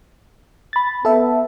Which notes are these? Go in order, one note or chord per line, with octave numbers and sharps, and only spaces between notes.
B5 A6
B3 A4 E5